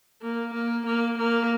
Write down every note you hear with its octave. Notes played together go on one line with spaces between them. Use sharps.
A#3
A#3
A#3
A#3